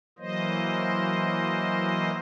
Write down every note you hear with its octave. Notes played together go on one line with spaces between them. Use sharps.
E3 F#3 A#3 C5 D#5